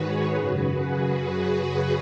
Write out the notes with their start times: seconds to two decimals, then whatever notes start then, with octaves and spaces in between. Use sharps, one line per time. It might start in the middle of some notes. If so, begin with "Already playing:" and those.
Already playing: G#2 D#3 F#4 G#4 B4 C#5
0.32 F#2 C#3 F#4 B4
0.71 G#4